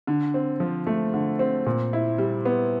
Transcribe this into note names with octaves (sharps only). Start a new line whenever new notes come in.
D3
C4
F3
A3
D3
C4
A#2
E4
G3
B3